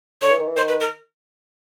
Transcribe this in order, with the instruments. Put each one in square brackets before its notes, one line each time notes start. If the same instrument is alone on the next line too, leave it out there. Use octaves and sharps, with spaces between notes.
[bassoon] D3 [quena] C#5
[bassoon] E3
D#3
E3
[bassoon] D#3 [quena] C5
[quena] B4
A#4